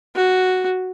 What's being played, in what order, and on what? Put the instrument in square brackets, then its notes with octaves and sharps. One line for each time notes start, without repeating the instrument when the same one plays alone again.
[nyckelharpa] F#4